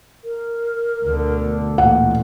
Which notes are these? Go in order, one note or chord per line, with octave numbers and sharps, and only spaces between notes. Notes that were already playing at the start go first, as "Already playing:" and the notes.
A#4
D2 B2 D3
A1 D2 A#2 F#5